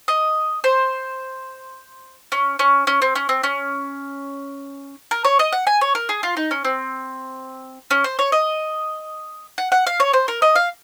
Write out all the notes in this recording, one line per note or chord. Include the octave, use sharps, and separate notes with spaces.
D#5
C5
C#4
C#4
C#4
C4
C#4
C4
C#4
A#4
C#5
D#5
F#5
G#5
C#5
A#4
G#4
F4
D#4
C#4
C4
C#4
C5
C#5
D#5
F#5
F#5
F5
C#5
C5
A#4
D#5
F5